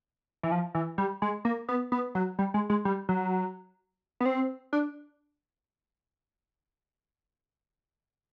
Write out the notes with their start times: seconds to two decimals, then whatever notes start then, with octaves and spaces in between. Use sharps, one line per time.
0.43 E3
0.52 F3
0.75 E3
0.98 G3
1.22 G#3
1.45 A#3
1.69 B3
1.92 B3
2.15 F#3
2.39 G3
2.54 G#3
2.70 G#3
2.85 G3
3.09 F#3
4.20 B3
4.26 C4
4.73 D4